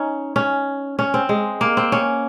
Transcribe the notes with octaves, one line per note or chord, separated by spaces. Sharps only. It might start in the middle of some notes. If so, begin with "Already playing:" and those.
Already playing: C#4 D#4
C#4
C#4
C4
G#3
A#3
C4
C#4